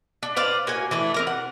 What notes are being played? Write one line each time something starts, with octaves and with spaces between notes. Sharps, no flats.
D4
B4 C5 D5 F5
A#3 F#4 G#5
E3 A3 D4
C4 A#4 A#5
F#5